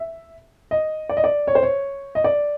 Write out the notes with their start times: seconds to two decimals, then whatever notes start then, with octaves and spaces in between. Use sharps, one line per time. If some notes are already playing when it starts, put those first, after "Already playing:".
Already playing: E5
0.71 D#5
1.09 D5
1.17 D#5
1.24 D5
1.47 C#5
1.55 C5
1.63 C#5
2.15 D#5
2.24 D5